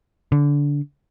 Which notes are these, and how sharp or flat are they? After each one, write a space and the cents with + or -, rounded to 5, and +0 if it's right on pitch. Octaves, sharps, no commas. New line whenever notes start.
D3 -20